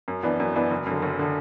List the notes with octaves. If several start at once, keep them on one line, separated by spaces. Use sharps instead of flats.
F#2
E3 B3 D4
F#2
E3 B3 D4
F#1
F#2 D3
F#1
D3